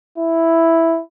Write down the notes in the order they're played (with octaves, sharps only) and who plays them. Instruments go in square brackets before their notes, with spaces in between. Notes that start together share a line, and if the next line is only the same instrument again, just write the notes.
[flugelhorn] E4